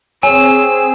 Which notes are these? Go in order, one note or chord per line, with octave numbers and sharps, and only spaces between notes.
C4 G#4 C#5 G#5 E6